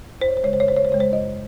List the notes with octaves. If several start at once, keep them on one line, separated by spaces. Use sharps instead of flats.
F2 C5
C#5
C5
C#3 G#3 C#5
C5
C#5
F2 C5
C#5
C5
C#3 G#3 C#5
C5
F#2 D#5